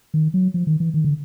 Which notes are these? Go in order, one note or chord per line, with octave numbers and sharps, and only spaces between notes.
D#3
F#3
F3
D#3
E3
D#3
D3